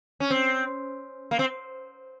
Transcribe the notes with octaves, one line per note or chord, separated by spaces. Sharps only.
C#4
C4
A#3
C4